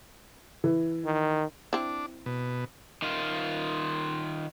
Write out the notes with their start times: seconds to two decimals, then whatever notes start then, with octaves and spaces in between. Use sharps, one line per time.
0.64 E3
1.05 D#3
1.73 C4 D4 E4
2.26 B2
3.02 D#3 F4